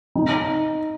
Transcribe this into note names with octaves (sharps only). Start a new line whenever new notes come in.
D#4